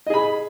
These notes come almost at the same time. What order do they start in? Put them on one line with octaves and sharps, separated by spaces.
D#5 G#4 B5